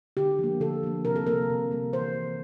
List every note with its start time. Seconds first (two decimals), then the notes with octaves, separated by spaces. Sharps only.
0.17 D3 G4
0.39 F3 A#3
0.60 D3 A4
0.83 F3 A#3
1.05 C3 A#4
1.16 A4
1.27 G3 A#3 A#4
1.50 C3
1.71 G3 A#3
1.93 E3 C5
2.15 A#3